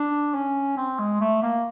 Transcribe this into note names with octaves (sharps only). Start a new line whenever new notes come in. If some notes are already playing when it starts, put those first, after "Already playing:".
Already playing: D4
C#4
C4
G#3
A3
A#3